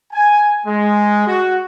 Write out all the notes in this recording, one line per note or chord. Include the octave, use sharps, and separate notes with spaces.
G#5
G#3
F#4